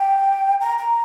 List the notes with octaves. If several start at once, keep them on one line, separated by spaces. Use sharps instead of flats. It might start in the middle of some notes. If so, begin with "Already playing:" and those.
Already playing: G5
A#5
A#5